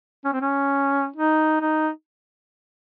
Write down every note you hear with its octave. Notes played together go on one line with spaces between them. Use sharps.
C#4
C4
C#4
D#4
D#4